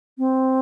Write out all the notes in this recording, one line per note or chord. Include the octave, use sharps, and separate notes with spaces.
C4